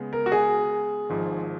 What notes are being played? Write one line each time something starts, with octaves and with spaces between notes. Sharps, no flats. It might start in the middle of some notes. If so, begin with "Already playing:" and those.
Already playing: C#3 G#3 B3
A#4
F#4
G#4
G#1 G#2 F3